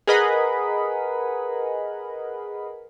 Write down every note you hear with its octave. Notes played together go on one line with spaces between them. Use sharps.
G#4 A#4 B4 D#5 F#5 B5